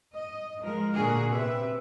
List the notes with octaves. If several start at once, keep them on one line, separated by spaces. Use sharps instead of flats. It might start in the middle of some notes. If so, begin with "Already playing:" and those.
D#5
F3 G#3 A#4
A#2 D3 D4 F#4 G#4 A#4
C3 B4 E5